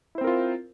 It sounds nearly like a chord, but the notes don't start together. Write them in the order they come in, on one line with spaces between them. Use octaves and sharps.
E4 C5 C4 A#4 F4